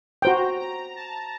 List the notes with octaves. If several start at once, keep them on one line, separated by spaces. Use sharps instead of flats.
F#4 C5 G5 A#5
A#5
A5